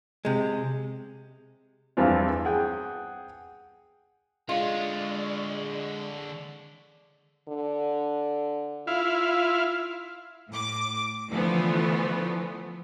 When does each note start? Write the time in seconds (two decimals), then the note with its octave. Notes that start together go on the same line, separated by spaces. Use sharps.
0.25 C3 G#3
1.97 E2 G2 E3 F3 C4 F4
2.45 G#4 F#5 G5
4.49 D3 G#3 F4 C#5 D5
7.49 D3
8.87 E4 F4 F5
10.49 A2 D6
11.30 D3 E3 F3 A3 B3